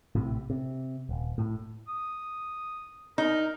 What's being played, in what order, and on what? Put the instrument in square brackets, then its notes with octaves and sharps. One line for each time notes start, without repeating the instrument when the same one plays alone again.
[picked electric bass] A#1 A2 C3
C3
D#1
A2
[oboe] D#6
[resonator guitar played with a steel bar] D#4 [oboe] A#4